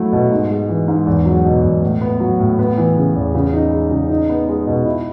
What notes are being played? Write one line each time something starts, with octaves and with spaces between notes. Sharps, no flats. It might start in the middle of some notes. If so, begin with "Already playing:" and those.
Already playing: F#3 A3 E4
B2
G#2
G#3
E3
G#2
E2
F#3
B2
E2
A2
B3
F#3
A2
B3
E3
C#3
E2
C#3
D#4
G#3
C#3
D#4
B3
G#3
B2
E4